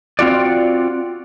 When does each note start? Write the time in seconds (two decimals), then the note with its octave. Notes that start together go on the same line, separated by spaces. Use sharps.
0.19 C4 F4 F#4 D5